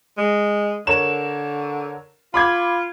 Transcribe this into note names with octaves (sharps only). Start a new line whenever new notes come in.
G#3
D3 A#4 C#5 E7
F4 B5 D6 G#6